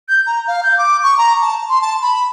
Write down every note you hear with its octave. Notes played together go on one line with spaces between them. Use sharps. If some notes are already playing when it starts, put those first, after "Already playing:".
G6
A#5
F5
G6
D6
C#6
A#5
A5
C6
A5
B5